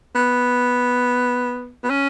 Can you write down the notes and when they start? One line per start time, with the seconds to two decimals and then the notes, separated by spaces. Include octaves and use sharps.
0.15 B3
1.84 B3
1.90 C#4